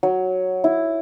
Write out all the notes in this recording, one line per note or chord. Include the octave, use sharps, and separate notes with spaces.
F#3
E4